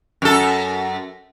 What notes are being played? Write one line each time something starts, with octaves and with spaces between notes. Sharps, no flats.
F#2 A4